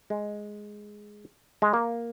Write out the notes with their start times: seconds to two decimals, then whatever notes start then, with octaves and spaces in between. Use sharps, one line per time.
0.10 G#3
1.62 G#3
1.74 A#3